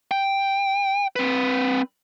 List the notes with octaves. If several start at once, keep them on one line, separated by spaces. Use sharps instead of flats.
G5
C4 B4